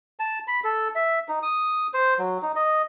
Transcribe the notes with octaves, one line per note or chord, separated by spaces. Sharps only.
A5
B5
A4
E5
D#4
D#6
C5
F#3
D#4
D#5